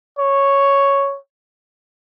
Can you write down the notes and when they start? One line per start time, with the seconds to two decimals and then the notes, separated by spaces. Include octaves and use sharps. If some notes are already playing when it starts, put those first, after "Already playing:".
0.19 C#5